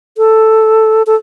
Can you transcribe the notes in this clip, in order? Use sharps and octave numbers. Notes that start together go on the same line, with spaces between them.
A4
A4